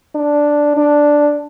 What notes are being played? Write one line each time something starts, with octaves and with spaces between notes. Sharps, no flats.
D4
D4